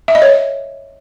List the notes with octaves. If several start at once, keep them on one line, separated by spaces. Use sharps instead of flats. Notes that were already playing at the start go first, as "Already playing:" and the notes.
E5
D#5
C#5